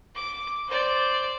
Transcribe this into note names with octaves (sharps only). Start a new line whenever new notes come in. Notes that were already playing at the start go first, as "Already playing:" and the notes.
D6
C5 D5